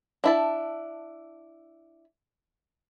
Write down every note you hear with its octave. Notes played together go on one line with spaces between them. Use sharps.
D4 E4 A5